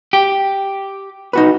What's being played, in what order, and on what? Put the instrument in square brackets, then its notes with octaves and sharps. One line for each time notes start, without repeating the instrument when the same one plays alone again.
[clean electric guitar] G4
[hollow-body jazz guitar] D#4 F#4 B4